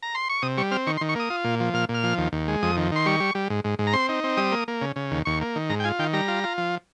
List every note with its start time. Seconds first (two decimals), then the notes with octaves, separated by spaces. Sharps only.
0.03 A#5
0.15 C6
0.29 C#6
0.42 C3 D#6
0.58 G3 C#6
0.71 C4 F6
0.87 D#3 C#6
0.97 C6
1.01 D#3
1.09 C#6
1.15 A#3 D#6
1.30 F4
1.44 A#2
1.60 F3
1.74 A#2 F6
1.89 A#2
1.94 F6
2.03 F3
2.18 D#2
2.33 D#2
2.48 G#3
2.63 F2 D#6
2.77 D#3
2.92 D#3 C6
3.06 G3 C#6
3.20 G3
3.35 G3
3.50 G#2
3.64 G#2
3.79 G#2
3.87 A#5
3.93 C4 C6
4.09 D#4
4.24 C4
4.37 G3 D#6
4.52 A#3
4.68 A#3
4.82 C#3
4.96 C#3
5.11 D#2
5.25 D#2 C#6
5.41 A#3
5.56 D#3
5.70 G#2 A#5
5.80 G5
5.84 F4 G#5
5.99 D#3 G5
6.13 G3 A#5
6.28 F4
6.44 F4
6.58 F3